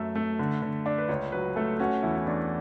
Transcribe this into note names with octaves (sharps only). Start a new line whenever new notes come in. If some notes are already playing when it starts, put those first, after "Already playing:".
Already playing: F#2 A3 E5
A3
D3
D3
D4
B4
C#2 C#5
F#3 B4
A3 A4
C#4 F#4
E2 E4
E4
E2 D4